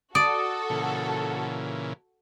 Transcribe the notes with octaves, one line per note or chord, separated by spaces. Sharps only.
F#4 A4 D5 D#6
A#2 C#3 E3